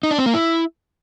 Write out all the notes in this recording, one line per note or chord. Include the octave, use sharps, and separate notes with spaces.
D#4
D4
C4
A#3
E4